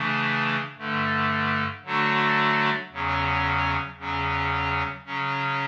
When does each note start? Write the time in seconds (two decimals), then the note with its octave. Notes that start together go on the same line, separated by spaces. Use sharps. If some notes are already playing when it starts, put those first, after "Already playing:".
Already playing: C#3 E3 A3 D4
0.78 G2 D3 A3
1.85 D3 F#3 A3 D4 F#4
2.92 E2 C#3 F#3 C#4
3.98 E2 C#3 F#3 C#4
5.05 C#3 F#3 C#4